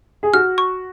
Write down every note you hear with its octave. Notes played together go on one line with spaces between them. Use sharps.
G#4
F#4 F6
C#6